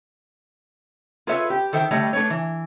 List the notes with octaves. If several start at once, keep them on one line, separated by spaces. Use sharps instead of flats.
F4 G#4 A4 B4 C#5 E5
G4
D#3 A4 C5 E5 G5
D3 G3 A3 C#5 D#5 G5
A3 D4 B4 C#5
E3